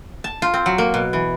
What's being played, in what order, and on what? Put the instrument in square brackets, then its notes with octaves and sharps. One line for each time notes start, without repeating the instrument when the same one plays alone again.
[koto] A5
F4
C4
F#3
A#3
B2
E3